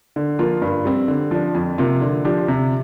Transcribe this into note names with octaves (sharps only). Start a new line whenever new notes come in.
D3
F3 A#3 F4
G2
G3 C4
D3
F3 D4
F2
C3 A#3 F4
D3
F3 D4 G4
C3